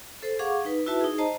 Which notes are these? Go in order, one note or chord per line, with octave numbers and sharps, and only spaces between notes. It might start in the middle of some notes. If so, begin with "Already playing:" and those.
A4 C5
G#4 F5 F#5 C#6 D6
D#4 B4
E4 F#4 B4 E5 A5
D#4 G#4
C5 D#5 A5 A#5